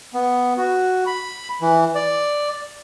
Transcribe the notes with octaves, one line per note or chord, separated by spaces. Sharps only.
B3
F#4
B5
E3
D5